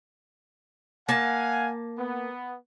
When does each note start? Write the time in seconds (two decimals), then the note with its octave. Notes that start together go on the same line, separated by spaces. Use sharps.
1.09 A#3 F5 F#5 G#5 A5
1.99 B3